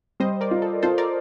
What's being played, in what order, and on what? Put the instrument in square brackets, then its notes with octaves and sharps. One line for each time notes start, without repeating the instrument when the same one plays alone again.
[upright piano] G3 [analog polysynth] C5 D#5
[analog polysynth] A#4 D5
[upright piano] F4
[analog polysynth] A4
[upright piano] F4 [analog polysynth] A4 C5
[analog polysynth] A#4 D5